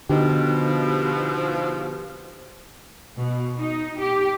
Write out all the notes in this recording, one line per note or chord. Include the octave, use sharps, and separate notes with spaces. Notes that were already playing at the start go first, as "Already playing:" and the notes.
B2 D3 F3 D#4 G4
B2
D#4
G4